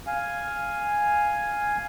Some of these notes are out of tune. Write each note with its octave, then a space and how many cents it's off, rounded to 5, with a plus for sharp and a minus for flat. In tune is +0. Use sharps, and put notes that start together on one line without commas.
F5 +0 G#5 +0